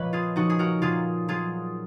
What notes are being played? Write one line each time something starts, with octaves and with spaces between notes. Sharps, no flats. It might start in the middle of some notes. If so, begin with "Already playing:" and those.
Already playing: A#2 F3 B4 C#5 D#5
F4 G#4
F3 D#4 F#4
G#4
F#4 A#4
A#2 F4 G#4
F#3 F4 G#4